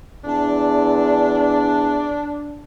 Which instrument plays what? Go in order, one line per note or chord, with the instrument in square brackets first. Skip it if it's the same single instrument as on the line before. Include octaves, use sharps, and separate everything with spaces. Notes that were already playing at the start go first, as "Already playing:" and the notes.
[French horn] E2 [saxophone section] D4